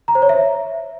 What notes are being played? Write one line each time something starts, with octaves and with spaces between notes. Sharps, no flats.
A#5
C5
C#5
E5